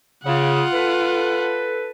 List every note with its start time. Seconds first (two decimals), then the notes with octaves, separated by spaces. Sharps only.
0.24 C#3 F4 F#5
0.73 A4 B4